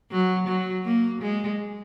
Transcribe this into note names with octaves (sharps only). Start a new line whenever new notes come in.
F#3
F#3
A#3
G#3